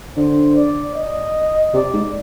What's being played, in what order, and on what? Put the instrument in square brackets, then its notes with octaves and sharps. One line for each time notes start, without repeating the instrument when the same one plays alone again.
[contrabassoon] D3 [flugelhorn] C5
[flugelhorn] D5
D#5
[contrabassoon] C3 [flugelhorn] D5
[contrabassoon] G#2